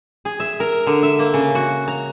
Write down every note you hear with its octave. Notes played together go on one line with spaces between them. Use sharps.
G#4
E5
A#4
D3
E5
A#3
C#3
F#4
A#5